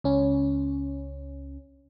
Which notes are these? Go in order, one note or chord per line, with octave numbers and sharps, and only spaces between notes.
C#2 C#4